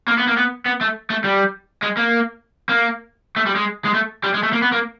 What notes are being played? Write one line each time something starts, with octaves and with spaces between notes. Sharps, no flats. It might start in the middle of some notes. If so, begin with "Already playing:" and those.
A#3
B3
A#3
B3
B3
A3
A3
G3
G#3
A#3
A#3
A3
G3
G#3
G#3
A3
G3
G#3
A3
A#3
B3
A#3